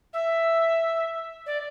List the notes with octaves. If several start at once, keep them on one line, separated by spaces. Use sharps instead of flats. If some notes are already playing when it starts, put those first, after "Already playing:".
E5
D5